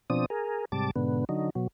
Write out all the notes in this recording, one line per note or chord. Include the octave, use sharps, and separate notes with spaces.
B2 F3 C4 D4 D#6
G#4 A#4
G#2 C3 G3 A5 D6
G#2 B2 D3 B3
D3 F#3 D#4
B2 F#3